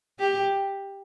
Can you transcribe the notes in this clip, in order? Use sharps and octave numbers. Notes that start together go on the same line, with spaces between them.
G4